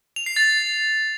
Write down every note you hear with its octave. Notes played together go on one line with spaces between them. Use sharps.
F7
C7
A6